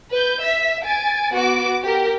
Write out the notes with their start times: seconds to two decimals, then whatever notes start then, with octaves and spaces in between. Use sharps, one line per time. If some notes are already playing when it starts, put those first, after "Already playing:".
0.12 B4 G6
0.42 E5 B6
0.83 G#5 A6 D7
1.33 B3 F#4 D6 D7
1.84 G4 A#4